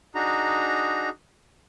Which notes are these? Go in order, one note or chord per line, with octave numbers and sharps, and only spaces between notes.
D4 D#4 F#4 G#4 A#5